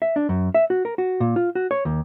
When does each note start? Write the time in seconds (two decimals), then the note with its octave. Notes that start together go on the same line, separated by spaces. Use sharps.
0.02 E5
0.16 D4
0.29 F#2
0.55 E5
0.70 F#4
0.85 A#4
0.98 F#4
1.20 A#2
1.36 F4
1.55 F#4
1.71 C#5
1.85 D#2